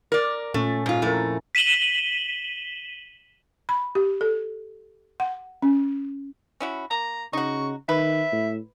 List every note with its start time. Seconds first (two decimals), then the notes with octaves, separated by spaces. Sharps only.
0.12 A#4 D5
0.54 A#2 A3 C#4
0.86 G#2 F4
1.02 F2 A3 E4 F4 A#4
1.55 B6 D#7 E7 F#7 G7
3.69 B5
3.95 G4
4.21 A4
5.20 F#5
5.62 C#4
6.60 C#4 E4 F#4
6.91 A#3 A#5
7.33 C#3 D#4 F#4 C#6
7.89 D#3 B4 E5
8.32 A2